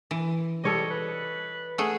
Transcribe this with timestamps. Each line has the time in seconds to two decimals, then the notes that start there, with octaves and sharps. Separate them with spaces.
0.11 E3
0.64 G3 A4 C#5 D#5
0.90 B4
1.78 A3 G#4 F#5